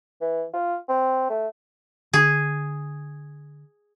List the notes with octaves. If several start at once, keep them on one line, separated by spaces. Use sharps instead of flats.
E3
F4
C4
A3
D3 G#4